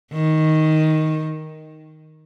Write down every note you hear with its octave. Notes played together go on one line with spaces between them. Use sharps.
D#3